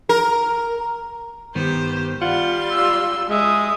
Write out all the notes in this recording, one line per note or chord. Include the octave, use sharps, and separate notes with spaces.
A#4
G2 D#3 B3 G4 C5
G3 F4 F#5 C6
E6
G#3 E5 D#6